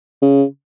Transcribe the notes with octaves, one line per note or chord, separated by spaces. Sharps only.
C#3